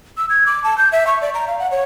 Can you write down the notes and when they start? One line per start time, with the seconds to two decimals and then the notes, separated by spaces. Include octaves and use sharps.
0.17 E6
0.30 G#6
0.46 D6
0.64 A5
0.78 G6
0.92 E5
1.07 C#6
1.22 D5
1.34 A#5
1.48 F5
1.59 F#5
1.71 C#5